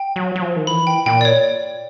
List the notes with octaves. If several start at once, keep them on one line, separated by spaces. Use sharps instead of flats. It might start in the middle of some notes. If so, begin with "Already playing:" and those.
Already playing: G5
F#3
F#3
F3
D#3
E3 B5
G5
A#2 G5
D5
C#5